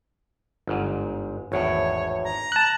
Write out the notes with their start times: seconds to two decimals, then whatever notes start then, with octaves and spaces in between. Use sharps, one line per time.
0.67 G1 G#2
1.52 G#1 E2 A2 C#5
2.24 A#5
2.52 A5 F#6